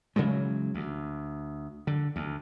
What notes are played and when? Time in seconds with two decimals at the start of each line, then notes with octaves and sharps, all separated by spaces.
0.16 C#3 E3 F#3 G#3
0.74 D2
1.87 D3
2.16 D2